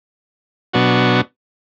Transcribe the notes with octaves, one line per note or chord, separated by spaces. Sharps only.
B2 F#3 B3 D4 F#4